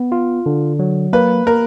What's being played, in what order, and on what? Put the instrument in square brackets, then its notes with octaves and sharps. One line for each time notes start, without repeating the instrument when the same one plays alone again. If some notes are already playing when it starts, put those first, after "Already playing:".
Already playing: [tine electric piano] B3
F4
D3
F#3
[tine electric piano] A#3 [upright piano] B4
[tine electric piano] A#3 [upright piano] A#4